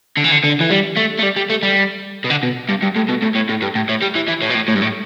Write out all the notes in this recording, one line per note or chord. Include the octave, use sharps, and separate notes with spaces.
D3
E3
D3
D3
E3
G3
A3
A3
G3
G3
A3
G3
B2
D3
B2
G2
G2
A2
B2
A2
A2
A2
G2
A2
A2
G3
E3
E3
A2
B2
A2
A2
G2
A2